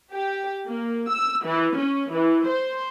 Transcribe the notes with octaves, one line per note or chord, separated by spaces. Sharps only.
G4
A#3
E6
E3
C#4
E3
C5